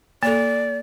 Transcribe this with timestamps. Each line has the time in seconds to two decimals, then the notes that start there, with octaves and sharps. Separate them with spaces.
0.23 A#3 A4 D5